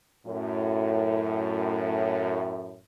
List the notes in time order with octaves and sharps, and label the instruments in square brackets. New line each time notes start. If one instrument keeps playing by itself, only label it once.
[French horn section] F#2 A2